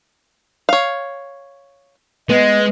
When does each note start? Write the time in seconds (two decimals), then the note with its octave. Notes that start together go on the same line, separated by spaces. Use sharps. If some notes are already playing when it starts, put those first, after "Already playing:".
0.69 C#5 F5
2.30 G#3 B3 D#5